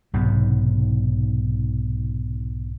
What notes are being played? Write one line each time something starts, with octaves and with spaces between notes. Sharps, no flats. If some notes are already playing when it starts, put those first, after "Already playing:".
B1 G#2 C3